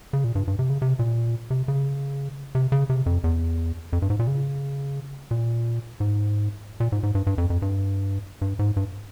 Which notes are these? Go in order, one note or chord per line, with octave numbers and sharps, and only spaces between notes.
C#3
A#2
G2
G2
C3
C#3
C3
A#2
C3
C#3
C3
C#3
C3
F2
E2
F2
G2
G#2
A#2
C#3
A#2
G#2
A#2
G#2
G#2
G2
G2
F2
F2
G2
G2
G#2
G2